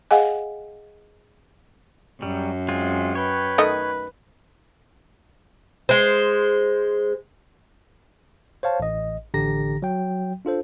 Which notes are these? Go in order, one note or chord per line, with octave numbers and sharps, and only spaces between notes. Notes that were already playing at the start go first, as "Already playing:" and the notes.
G#4 D#5 F5 F#5 G#5
F#2 F#3 G3
G#3 C4 F4
B4 C#5 G5
D#3 A3 D#5
G#3 C5
C5 C#5 F5 A5
A1 D#5
A1 D3 G4 A#5 A#6
F#3 G5
D4 F4 A4 C5